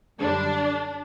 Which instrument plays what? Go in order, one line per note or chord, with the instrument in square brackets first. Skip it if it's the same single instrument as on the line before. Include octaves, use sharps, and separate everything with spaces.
[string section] F#2 D3 G3 D4